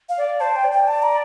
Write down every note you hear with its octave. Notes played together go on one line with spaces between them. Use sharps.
F5
D5
C5 A5
G5
D5
G5
A5
A#5